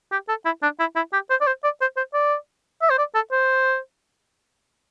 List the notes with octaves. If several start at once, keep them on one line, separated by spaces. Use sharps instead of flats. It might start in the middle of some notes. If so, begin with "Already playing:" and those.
G4
A4
E4
D4
E4
E4
G4
C5
D5
C5
D5
C5
C5
D5
E5
C5
D5
A4
C5